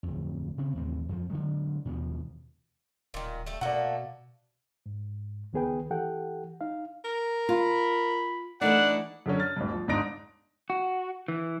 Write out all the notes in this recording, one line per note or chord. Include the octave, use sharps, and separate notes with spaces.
D1 F2
C#3 C4
D#2 A2 E3 C4
F2 F3
D3 D#3 F#3 G#3
D#2 B2 E3 F3
D1 A#2 D#3
G3 A3
B2 A3 A#3 D5 F#5
G#2
C#2 D#3 B3 G#4 B4 G5
E3 G4 A4 F#5 G5
D#4 F5
A#4
F4 B5
E3 A3 D4 D#4 F#5
F#2 D3 C#4
F6 A6
D1 G2
F3
G1 G#2 D4 D#4 A#6 D7
F#4
E3